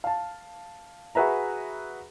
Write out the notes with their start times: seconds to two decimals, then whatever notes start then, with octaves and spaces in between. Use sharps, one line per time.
0.04 F5 A5
1.15 F#4 G#4 B4 E5 A#5